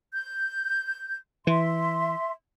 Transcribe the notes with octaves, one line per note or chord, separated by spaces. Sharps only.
G6
E3 E5 C6